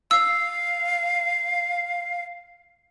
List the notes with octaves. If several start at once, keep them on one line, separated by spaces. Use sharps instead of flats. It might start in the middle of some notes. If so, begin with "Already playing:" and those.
F5 E6